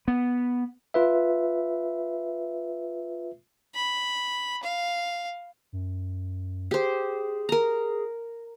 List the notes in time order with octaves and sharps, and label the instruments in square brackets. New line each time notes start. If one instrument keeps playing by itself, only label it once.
[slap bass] B3
[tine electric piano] F4 B4 E5
[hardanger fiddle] B5
F5
[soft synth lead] F#2
[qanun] G4 C5 [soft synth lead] G#4
[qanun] A#4 A#5